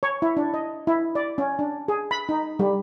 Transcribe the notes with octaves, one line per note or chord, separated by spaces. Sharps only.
C#5
E4
D4
D#5
E4
D5
C#4
D4
G#4
B5
D#4
G3